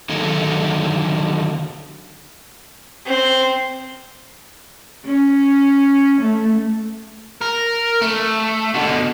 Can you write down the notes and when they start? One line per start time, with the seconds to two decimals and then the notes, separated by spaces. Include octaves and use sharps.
0.09 D3 D#3 F#3 D#4 G#4 A4
3.06 C4
5.05 C#4
6.21 A3
7.41 A#4
8.01 A3
8.74 B2 D3